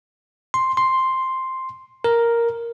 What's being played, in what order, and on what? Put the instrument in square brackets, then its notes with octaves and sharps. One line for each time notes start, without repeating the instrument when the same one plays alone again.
[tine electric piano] C6
C6
A#4